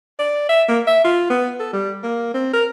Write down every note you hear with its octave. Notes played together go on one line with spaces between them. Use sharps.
D5
E5
A#3
E5
F4
B3
A4
G3
A#3
C4
A#4